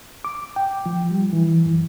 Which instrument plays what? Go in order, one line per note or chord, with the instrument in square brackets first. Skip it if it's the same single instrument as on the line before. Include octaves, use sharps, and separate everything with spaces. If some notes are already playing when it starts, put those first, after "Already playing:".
[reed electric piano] D6
G5
F3
G3
E3
F#2